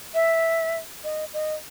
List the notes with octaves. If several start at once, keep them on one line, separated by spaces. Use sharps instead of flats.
E5
D#5
D#5